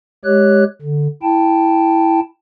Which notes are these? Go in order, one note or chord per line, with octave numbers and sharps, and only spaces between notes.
G#3 G4 C#5 F#6
D3
E4 G5 A5